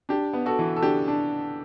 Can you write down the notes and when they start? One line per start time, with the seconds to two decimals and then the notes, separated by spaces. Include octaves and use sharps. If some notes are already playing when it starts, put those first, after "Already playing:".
0.09 D4 G4
0.33 B3
0.46 F#4 A4
0.59 E3
0.76 A4
0.82 D4 G4
1.08 D4